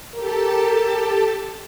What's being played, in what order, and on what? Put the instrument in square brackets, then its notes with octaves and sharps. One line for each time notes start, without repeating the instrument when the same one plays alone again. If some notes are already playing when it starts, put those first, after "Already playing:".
[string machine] G4 A4 A5 [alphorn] A#4